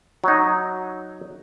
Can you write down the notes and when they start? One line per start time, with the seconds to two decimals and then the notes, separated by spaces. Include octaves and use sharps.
0.24 F#3 D#4